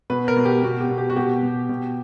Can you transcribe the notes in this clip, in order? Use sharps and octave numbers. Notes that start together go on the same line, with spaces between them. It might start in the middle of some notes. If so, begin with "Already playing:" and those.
B2 B4
A#4
B2
G4
B2 F#4
G4
B2
G4
F#4
B2 G4
B2
B2